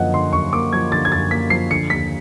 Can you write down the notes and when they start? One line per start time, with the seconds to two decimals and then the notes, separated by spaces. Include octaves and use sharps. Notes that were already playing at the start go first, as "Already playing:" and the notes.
Already playing: F#2 D3 F3 A#3 D#5 F#5
0.14 D3 C6
0.33 F#2 C#6
0.53 A#3 D6
0.73 F3 G#6
0.92 D3 A6
1.05 G#6
1.12 F#2 A6
1.31 A#3 B6
1.50 F3 C7
1.70 D3 C#7
1.90 D#2 B6